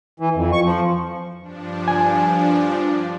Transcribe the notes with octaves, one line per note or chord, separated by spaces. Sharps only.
E3
F2
C#6
F3
G2 F3 D4
G#5